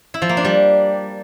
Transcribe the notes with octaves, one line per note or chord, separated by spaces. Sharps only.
E4
F3
A#3
D4
G3